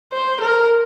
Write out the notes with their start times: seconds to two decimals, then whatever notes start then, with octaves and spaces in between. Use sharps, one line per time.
0.12 C5
0.41 A#4